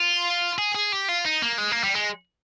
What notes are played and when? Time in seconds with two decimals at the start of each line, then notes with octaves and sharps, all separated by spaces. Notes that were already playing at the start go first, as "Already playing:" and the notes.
Already playing: F4
0.58 G#4
0.75 G#4
0.92 G4
1.08 F4
1.25 D#4
1.42 A#3
1.58 G#3
1.71 A#3
1.84 G3
1.95 G#3